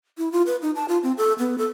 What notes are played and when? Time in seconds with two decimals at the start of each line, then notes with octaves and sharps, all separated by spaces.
0.18 E4
0.32 F4
0.46 B4
0.62 D#4
0.75 A5
0.88 F4
1.03 C4
1.18 A4
1.39 B3
1.58 A4